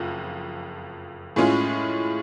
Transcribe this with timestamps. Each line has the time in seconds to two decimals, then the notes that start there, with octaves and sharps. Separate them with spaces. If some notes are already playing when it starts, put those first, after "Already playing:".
Already playing: F#1 F2
1.36 A2 G#3 C#4 F4 G#4